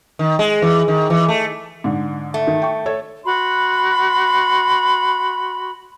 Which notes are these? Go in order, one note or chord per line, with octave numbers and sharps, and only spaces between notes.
D#3
G#3
E3
D#3
E3
A3
G#2 D3
A3
D#3
G5 C#6
A4 C#5
F#4 B5 C6